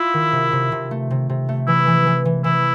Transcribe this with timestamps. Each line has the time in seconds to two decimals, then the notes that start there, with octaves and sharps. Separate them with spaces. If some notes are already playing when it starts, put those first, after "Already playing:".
Already playing: E4 F4
0.14 D#3
0.32 C3
0.52 C3
0.72 C3
0.91 A3
1.11 C3
1.29 C3
1.49 A3
1.67 E3 E4
1.87 E3
2.07 E3
2.25 E3
2.44 E3 E4